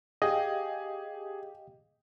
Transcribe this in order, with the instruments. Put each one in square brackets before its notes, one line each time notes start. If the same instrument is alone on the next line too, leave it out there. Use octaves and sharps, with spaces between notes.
[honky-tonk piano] G4 [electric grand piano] G#4 [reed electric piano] D#5 F5 G5